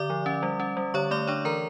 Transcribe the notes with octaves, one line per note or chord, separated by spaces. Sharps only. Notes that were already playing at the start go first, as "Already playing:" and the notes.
Already playing: D3 D5 D6
F3
C#4
G3
C#4
G3
D3 C#5 C#6
A3 D5 D6
D4 C#5 C#6
E3 A#4 A#5